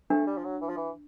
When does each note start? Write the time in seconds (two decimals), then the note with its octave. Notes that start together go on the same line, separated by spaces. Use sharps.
0.10 A3 D4
0.27 G3
0.37 F3
0.44 F#3
0.61 E3
0.69 F3
0.77 E3